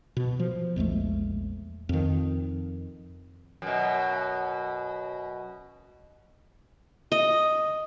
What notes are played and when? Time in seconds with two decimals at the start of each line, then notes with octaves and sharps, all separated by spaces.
0.17 B2
0.39 F3
0.76 A#1 E2 G#3 A3
1.89 F2 D#3
3.62 F#2 B2
7.12 D#5